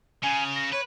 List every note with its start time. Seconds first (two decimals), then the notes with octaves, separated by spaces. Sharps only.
0.23 C#3 G#5
0.56 A#6
0.73 B4 C#5